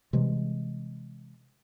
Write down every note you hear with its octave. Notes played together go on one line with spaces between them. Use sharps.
C3 E3 G3 G#3